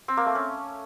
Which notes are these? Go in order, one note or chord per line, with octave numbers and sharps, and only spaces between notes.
C4
A#3
A3
C#4